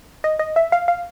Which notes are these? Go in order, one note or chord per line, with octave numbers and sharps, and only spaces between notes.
D#5
D#5
E5
F5
F5